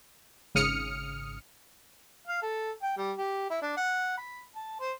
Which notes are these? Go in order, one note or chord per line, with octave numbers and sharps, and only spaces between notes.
G#1 C#3 D#6 F6 C#7
F5
A4
G5
G3
G4
E4
D4
F#5
B5
A5
C5